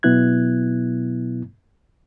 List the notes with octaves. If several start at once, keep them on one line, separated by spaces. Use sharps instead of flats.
B2 F#3 B3 E4 F#6 G#6